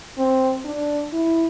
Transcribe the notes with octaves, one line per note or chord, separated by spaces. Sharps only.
C4
D4
E4